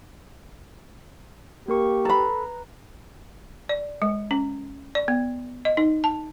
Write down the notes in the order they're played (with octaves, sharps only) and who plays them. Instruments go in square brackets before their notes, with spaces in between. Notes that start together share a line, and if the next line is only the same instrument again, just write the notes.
[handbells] A#3 A#4 C#6 [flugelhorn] G4
[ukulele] A4 B5 [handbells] B4 A#5
[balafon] D5
G#3
C#4
D5
B3
D#5
D#4
A5